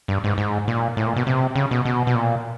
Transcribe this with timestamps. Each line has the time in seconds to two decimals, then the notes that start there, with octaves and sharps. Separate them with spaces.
0.08 G2
0.24 G#2
0.38 G#2
0.68 A#2
0.97 A2
1.06 A#2
1.16 B2
1.27 C3
1.56 C#3
1.71 B2
1.85 B2
2.07 B2
2.15 A#2